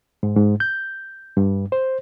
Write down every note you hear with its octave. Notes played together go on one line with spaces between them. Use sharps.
G#2
G#2
G6
G2
C5